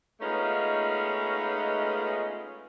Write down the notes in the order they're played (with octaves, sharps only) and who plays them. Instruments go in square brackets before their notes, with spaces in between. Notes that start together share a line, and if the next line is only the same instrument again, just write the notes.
[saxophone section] G#3 A3 B3 C#4 D#4 F4